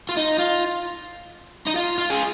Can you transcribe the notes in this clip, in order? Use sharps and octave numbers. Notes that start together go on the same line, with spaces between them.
F4
D#4
F4
D#4
F4
F4
G#4